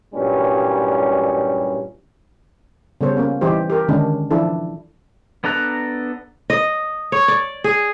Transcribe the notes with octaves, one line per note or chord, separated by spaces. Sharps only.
A1 G2 A#2 F#3 G3 C#4
C#3 G3 B3 A4 C5 C#5
A#3 C#4
E3 G3 D#4 G4 C5
G4 A#4
D3 D#3 G#3 C#4 D4
E3 F3 D4 E4 A4
B3 D4 A4 A#5 F#6
D#5
C#5
D5
G#4